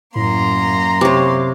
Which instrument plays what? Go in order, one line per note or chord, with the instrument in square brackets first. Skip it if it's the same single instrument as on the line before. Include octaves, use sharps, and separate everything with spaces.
[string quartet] F#2 A#3 C6 [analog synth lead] A2 [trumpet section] A#5
[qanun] C3 C#5 [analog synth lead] D6